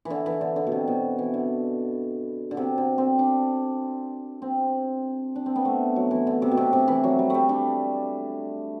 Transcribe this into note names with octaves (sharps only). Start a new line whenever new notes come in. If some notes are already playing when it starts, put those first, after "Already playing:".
E3
D3
E3
D3
D3
B2
C3
B2
E3
D3
D3
C3
D3
C4
D4
C4
D4
C4
B3
A3
F#3
E3
D3
C3
B2
C3
C3
E3
F#3
G3
G3 A3
D4